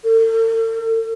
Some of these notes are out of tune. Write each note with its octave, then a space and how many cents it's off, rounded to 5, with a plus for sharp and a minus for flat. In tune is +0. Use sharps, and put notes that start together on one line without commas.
A4 +45